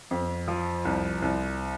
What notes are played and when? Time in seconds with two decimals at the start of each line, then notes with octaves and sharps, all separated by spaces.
0.11 F2
0.48 F3
0.85 C2
1.22 C2